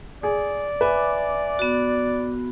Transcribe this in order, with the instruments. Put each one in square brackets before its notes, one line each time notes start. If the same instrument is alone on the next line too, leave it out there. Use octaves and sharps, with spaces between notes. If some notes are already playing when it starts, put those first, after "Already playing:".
[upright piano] G#4 [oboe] D5
[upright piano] B4 [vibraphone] E5 G#5 D6
[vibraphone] B3 F#4